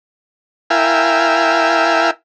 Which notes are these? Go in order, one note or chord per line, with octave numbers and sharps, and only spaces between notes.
E4 A#4 E5 F5 G5 G#5